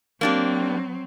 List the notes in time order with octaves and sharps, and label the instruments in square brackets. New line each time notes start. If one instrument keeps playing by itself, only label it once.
[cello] F#3 C4 [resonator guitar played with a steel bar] A#3 D4 G4